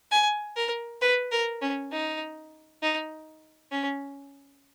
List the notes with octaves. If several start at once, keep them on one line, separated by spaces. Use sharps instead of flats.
G#5
A#4
B4
A#4
C#4
D#4
D#4
C#4